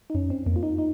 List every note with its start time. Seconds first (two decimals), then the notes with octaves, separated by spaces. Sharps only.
0.10 D#4
0.14 F#2 C#4
0.30 C4
0.46 F2 A#3
0.56 F4
0.63 D#4
0.78 D#4